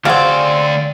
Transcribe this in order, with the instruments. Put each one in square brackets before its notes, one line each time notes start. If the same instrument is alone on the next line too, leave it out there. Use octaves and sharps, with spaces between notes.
[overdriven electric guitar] D2 D5 [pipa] C#3 C4 [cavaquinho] F#4 F5 G#5